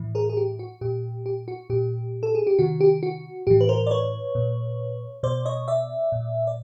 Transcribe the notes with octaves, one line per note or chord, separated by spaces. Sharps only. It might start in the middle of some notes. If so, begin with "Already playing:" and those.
Already playing: A2 E3
G#4 A#4
G#4
G4
F#4
A#2 G4
G4
F#4
A#2 G4
A4
G#4
G4
C3 D#3 F#4
G4
F#4
A2 E3 G4
B4
A#4 C5
D5
B4 C#5
A#2
B2 C5 D5
C#5 D#5
D5 E5
A#2
D5